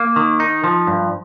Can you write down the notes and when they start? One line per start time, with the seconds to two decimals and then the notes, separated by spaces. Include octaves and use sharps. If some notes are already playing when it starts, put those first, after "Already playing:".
Already playing: A#3
0.16 D#3
0.40 D#4
0.64 F3
0.87 G2